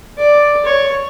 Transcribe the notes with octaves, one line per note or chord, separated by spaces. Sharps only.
D5
C#5